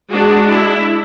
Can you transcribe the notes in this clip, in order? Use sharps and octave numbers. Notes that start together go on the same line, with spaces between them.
G#3 D4 F#4
E4